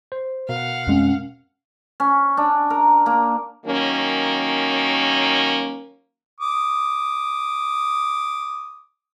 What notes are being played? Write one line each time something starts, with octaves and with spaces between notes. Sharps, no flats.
C5
B2 A#4 F5 F#5
F2 G#3 C4 C#4
C#4
D4
A#4
A#3
D#3 F#3 A#3 C#4
D6 D#6